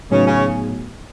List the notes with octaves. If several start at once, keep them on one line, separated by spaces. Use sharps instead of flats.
A2 C#3 F#3 B3 C#4 D#4 G#4
C#3 C#4